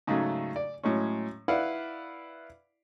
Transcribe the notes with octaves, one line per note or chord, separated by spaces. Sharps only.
G#2 C#3 F#3 A3
D5
A2 F#3 G#3 C#4
E4 B4 D5 F5 F#5